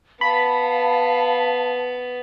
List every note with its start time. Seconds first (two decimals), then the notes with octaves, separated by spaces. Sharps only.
0.21 B3 F5 A5 B5